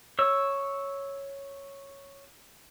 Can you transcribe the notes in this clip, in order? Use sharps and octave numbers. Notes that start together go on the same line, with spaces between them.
C#5 E6